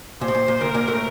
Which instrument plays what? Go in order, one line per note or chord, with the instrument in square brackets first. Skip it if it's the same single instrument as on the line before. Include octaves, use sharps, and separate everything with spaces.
[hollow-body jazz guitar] A#2 [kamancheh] C5
[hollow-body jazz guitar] A2
A#2
A#2
[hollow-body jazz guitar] D2 D3 [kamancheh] A#4
[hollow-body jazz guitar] A#2 A#3
A2 A3